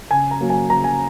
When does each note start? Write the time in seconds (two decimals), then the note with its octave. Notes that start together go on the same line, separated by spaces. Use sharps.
0.11 C#3 G#5
0.31 A#5
0.41 F#3 A#3
0.50 G#5
0.70 C#3 A#5
0.84 G#5